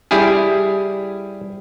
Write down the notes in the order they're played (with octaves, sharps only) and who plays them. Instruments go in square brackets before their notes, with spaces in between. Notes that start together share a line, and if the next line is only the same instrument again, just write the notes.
[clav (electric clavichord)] G3 E4 G4 G#4